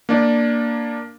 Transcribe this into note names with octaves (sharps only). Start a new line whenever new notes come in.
A#3 D4 D5